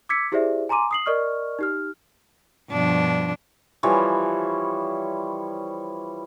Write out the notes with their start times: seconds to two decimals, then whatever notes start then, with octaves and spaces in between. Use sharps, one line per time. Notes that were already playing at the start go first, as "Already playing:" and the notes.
0.09 D6 E6 G#6 B6 C#7
0.32 E4 G4 G#4 C5 D5 E5
0.69 G#5 A#5 C6 D6 D#7
0.91 D#6 C7 F#7
1.06 A#4 D5 D#5 C#6 F6
1.59 D#4 G4 F6
2.71 G2 B2 F3 D4
3.83 E3 F3 G3 C#5